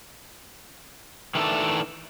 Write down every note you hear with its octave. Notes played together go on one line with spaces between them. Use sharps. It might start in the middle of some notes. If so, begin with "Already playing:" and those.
D#3 E3 A3 D4 A4